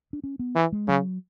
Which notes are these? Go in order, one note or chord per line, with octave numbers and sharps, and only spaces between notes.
D4
C#4
B3
E3
G#3
C#3 F#3